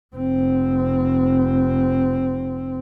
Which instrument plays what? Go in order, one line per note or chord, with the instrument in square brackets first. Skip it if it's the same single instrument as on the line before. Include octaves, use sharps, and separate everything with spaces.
[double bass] F1 C4